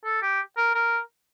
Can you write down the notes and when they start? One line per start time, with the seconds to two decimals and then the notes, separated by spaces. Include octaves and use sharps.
0.05 A4
0.22 G4
0.57 A#4
0.75 A#4